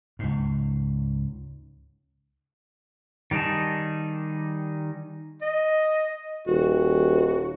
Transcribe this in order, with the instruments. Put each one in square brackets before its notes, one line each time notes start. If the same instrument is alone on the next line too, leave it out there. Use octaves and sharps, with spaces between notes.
[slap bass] C#2 G#2
[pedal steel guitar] D#3 G3 D#4 G#4 A5
[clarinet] D#5
[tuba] D#1 [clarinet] F#4